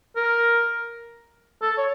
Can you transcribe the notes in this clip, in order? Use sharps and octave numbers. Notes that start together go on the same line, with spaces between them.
A#4
A4
C#5